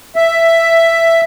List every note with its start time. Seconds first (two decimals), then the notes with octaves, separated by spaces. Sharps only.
0.16 E5